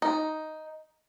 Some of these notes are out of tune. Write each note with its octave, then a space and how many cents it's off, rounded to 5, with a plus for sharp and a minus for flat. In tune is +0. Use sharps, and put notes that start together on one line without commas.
D#4 +5